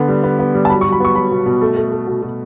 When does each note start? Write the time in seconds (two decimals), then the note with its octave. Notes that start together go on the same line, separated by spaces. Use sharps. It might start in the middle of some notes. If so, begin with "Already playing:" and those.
Already playing: D3 B3
0.08 G3
0.24 B3
0.39 B3
0.54 G3
0.65 A5
0.69 F#3 B5
0.81 C#6
0.85 F#3
0.93 B5
1.00 B3 C#6
1.15 F#3 B5
1.31 B2
1.46 B2
1.62 A3
1.77 A3
1.92 A3
2.07 B2
2.22 B2